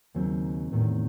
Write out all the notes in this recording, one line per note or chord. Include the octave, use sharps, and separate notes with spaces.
D#2 C#3 F#3 C4 D#4
E2 A2 C3 D#3